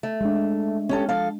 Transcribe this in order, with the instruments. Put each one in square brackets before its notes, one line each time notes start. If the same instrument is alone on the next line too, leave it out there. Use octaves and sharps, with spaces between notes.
[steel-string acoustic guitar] A3
[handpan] G#3 D4
[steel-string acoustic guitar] C#4 G4 A4
F3 A4 F5